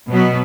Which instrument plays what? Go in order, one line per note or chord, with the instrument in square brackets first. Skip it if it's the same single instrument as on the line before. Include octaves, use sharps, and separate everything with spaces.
[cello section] B2 F#3 B3